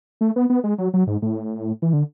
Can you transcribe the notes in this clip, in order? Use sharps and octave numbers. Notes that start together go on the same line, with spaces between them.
A3
B3
B3
G#3
F#3
F#3
G#2
A2
E3
D3